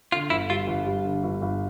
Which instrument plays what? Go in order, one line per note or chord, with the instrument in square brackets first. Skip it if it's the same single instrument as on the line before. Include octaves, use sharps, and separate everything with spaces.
[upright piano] D3 [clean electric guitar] F4
[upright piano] G1 [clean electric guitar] E4
[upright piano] G3 [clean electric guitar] F4
[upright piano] G1
G3
D3
G1
G1